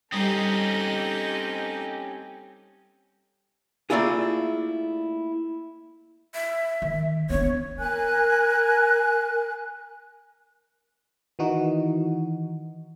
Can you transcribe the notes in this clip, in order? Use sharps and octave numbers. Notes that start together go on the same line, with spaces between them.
G3 C4 C#4 D#4 G4 A4 D#5 D#6
A3 A#3 D4 E4 F4 G#4
E5
D#3
B3 D4 C#5
A#4 G#5 F#6
D#3 E3 D#4 F#4